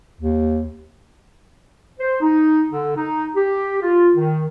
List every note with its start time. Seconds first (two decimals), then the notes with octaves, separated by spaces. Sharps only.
0.21 D#2
2.00 C5
2.21 D#4
2.71 D3
2.96 D#4
3.36 G4
3.82 F4
4.16 D#3